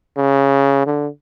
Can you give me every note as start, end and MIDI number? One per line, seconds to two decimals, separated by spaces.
0.17 0.84 49
0.87 1.08 50